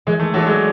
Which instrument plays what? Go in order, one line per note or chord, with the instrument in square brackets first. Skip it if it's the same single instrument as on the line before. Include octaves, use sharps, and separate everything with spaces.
[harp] E3 [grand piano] G#3
[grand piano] A3
[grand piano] F#3 [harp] B3 D4 A4
[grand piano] G#3